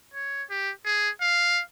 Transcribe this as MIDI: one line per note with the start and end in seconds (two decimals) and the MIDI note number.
0.14 0.43 73
0.50 0.71 67
0.85 1.10 68
1.21 1.62 77